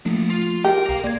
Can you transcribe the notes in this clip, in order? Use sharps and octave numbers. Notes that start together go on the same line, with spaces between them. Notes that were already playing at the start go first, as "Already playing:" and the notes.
F3 A3 A#3 D4
F4
G4 G#4 A#4
B1 A#4 F5 A#5 D6
A#3 D5 C6 G#6